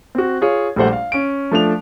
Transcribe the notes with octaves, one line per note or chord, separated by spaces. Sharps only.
C4 F#4
F4 G#4 C#5
A#1 G3 A3 C5 F#5
F5
C#4 D7
F3 A3 D4 F7